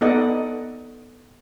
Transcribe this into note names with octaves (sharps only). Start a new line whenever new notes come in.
B3 D#4 A4 D5 D#5 F#5